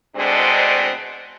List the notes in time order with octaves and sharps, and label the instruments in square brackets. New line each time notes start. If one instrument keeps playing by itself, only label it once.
[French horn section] D2 B2 G#3 C4 D4